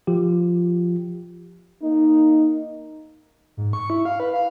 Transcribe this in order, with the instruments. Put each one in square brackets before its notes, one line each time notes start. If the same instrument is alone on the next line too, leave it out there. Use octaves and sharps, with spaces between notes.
[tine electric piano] F3 F4 G4
[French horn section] A#3 D#4
[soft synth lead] G#2
C#6
E4
F5
B4
F5